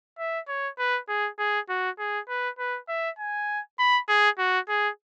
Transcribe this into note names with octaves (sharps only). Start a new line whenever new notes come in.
E5
C#5
B4
G#4
G#4
F#4
G#4
B4
B4
E5
G#5
B5
G#4
F#4
G#4